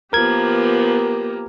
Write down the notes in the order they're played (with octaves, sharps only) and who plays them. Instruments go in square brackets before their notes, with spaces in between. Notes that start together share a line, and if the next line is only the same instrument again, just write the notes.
[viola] F3 B3 [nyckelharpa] A#3 G4 [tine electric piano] A#4 G#6